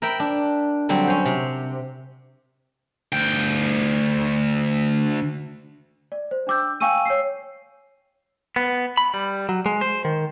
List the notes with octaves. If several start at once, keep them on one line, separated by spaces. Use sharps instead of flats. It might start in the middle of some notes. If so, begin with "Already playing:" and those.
A#4 E5 G5 B5
D4
D3 F#3 G3 C4
C#4 C5
C3
D2 G5
D5
C5
D4 G5 D6 E6 G6
F5 G5 G#5 C#6 E6 D#7
C#5 E6 C7
B3
B5
G3
F#3
G#3
C5
D#3